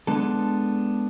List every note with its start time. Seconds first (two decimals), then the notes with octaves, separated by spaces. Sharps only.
0.07 G#3 B3 D4 A4